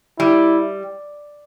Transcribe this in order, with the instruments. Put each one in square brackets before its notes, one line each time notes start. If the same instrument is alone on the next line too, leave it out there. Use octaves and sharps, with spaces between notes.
[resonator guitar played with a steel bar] G3 [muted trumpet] E4